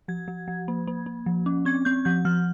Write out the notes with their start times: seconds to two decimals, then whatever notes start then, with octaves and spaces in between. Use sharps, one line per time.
0.08 F3 G#6
0.28 F3
0.48 F3
0.68 A#3
0.87 A#3
1.06 A#3
1.26 F3
1.46 C#4
1.65 C4 G#6
1.85 C4 G6
2.05 F3 G6
2.25 F3 F6